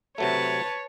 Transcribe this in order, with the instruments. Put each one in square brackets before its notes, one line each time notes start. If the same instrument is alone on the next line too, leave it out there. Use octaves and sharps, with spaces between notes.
[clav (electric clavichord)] C3 F#3 A3 [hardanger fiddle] B4 A5 [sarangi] C#5